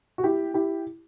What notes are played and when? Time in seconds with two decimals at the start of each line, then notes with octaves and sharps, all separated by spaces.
0.18 F#4
0.24 E4 G4
0.54 E4 G4